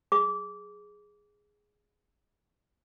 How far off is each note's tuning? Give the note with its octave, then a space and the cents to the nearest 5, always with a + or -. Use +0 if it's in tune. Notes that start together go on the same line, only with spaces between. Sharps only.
G#4 +0 D6 -20